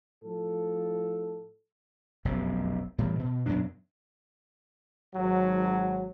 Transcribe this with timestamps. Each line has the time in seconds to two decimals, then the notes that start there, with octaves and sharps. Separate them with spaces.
0.24 A2 F3 A4
2.25 F1 B1 F#2 C3
2.98 A2 E3 F3 G3
3.19 B2
3.46 F#2 B2 F#3 D4
5.15 G#1 F#3